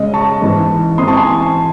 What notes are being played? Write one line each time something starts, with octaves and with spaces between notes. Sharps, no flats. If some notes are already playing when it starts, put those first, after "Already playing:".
Already playing: C#3 G#3 C#4 D#5
A5 C#6
G#2 E3 G#3
G#2 E3 C4 C6 D#6
A5 C#6
G#5 C6